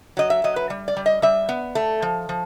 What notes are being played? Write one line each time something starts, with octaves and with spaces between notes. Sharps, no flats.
F#3 D#5
E5
F#3 D#5
B4
G3
D5
G3
D#5
G3 E5
B3
A3
F3
F3